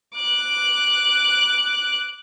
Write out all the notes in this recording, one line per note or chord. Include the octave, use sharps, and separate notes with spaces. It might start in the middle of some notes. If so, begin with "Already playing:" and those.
D6 F#6